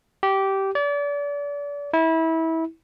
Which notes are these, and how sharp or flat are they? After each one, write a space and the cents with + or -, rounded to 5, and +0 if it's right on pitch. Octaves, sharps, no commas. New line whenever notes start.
G4 -15
D5 -35
E4 -25